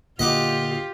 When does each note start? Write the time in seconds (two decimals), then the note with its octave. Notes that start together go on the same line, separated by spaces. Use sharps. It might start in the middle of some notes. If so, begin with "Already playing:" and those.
0.19 A#2 D3 A#3 F4 G4 D#5 F#5 D6